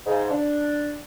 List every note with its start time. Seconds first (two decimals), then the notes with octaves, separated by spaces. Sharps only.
0.06 G#2 C#3
0.31 D4